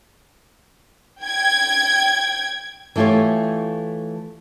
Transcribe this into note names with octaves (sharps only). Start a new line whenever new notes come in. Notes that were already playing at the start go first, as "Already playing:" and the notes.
G5 G#6
E3 A3 F4 G4 C#5